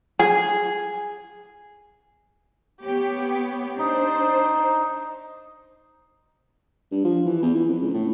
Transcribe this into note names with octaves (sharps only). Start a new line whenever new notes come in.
G#4
B3 G4 C#5
D4 D#4 C5
G2
F3
E3
E2
E3
F2
C#2
A2